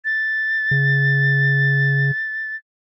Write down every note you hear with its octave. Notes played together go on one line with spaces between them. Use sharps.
A6
C#3